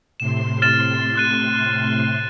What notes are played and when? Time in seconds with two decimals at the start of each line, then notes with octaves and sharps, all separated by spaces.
0.20 A2 C3 C6 E7
0.62 F6 A6 E7
1.16 F6 F#6 D#7